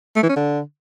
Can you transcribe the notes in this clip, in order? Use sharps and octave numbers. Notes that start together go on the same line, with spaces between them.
A3
E3
C#4
D3